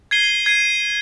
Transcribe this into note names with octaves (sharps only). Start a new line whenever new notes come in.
G#6 C7 D#7 G7
G#6 C7 D#7